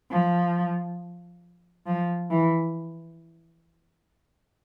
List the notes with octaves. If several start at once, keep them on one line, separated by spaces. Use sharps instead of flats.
F3
F3
E3